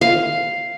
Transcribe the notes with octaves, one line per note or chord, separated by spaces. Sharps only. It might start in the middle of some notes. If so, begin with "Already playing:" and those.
F5